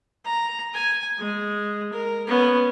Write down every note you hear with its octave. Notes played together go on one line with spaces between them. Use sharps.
A#5
G#5
G#3
A#4
B3 C#4